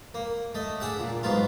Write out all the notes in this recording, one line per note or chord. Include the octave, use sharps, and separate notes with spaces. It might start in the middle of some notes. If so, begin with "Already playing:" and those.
A#3
A3 D#5
D4 G#4 E5 F#5
A#2
G#2 F#3 B3 F4